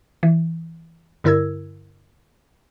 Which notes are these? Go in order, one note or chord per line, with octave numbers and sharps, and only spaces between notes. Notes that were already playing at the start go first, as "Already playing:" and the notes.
E3
G2 D3 E4 A#4 E6 G#6